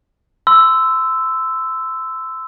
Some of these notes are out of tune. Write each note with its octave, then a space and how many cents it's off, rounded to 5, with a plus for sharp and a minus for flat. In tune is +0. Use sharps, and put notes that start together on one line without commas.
C6 -25 E6 +0